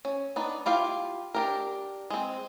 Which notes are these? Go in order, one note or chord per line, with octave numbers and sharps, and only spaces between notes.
C#4
B3 D4 D#4
E4 F4 G4 F5
D4 G4 A#4
G#3 C4